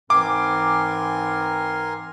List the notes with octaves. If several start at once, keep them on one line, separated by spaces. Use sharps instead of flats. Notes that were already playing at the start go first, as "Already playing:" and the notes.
G#2 E3 C4 A#4 G#5 C6 D6